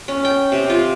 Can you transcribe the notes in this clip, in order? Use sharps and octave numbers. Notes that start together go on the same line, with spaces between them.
C#4
G5
C3
F4